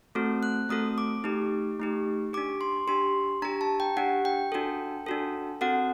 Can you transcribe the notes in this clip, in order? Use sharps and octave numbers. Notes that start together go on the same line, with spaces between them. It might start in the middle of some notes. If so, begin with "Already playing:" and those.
A3 C4 F#4 A4
F#6
A3 C4 F#4 A4 D#6
D6
A3 D#4 G4
A3 D#4 G4
D4 G4 D6
C6
D4 G4 C6
D4 G4 A#5
A5
G5
D4 G4 F#5
G5
D4 F#4 A4
D4 F#4 A4
C4 F#4 A4 F#5